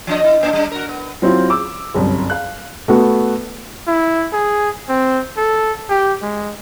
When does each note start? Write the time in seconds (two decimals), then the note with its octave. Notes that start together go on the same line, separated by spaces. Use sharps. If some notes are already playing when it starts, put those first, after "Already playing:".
0.07 F3 D4 D#5
0.24 E4
0.41 A#2 A#3 D4
0.53 G3 D4
0.72 F#4 A#4
0.89 B3
1.22 F#3 C4 E4 F4
1.50 D6 E6
1.94 G1 C2 F#2
2.30 F5 F#6
2.88 A3 B3 F#4
3.87 E4
4.33 G#4
4.89 C4
5.37 A4
5.89 G4
6.22 G#3